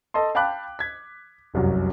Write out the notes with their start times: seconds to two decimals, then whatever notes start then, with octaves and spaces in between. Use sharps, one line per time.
0.14 A4 D#5 A5 C6
0.35 F5 G5 A5 B5 D6 F#6
0.79 G#6 B6
1.54 F1 C2 F#2 F#3